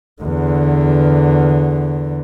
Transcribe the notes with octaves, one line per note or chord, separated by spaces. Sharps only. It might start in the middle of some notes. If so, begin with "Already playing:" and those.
E2 D3